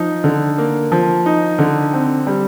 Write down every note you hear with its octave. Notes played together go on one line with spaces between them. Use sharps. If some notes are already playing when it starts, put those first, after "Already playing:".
Already playing: F3 D#4
D3
A#3
F3
D#4
D3
C4
G3